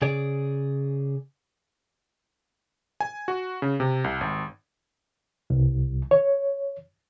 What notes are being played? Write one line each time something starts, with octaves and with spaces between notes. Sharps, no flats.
C#3 G#4 D5
G#5
F#4
C#3
C3
C2
G#1
C2
C#5